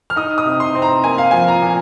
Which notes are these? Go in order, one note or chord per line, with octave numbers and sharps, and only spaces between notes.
F6
D#4 D#6
D#6
C3
C6
C4
A#5
A#3 G#5
F5
F3 G#5
A#5
A#2